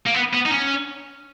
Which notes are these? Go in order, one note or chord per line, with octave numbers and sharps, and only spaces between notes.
A#3
B3
B3
D#4
C#4